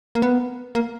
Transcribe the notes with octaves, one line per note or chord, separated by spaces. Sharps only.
A#3
B3
A#3